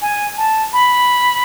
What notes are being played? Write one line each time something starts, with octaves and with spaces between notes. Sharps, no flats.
G#5
A5
B5